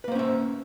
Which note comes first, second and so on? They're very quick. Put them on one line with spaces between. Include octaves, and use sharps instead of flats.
B4 A#3 C5 C#4 E5